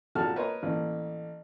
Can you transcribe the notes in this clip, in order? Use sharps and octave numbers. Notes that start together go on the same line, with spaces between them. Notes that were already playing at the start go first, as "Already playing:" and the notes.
A#1 F#4 A4 A5 F6
A#4 B4 C#5 D#5 A#5 C6
A1 A#3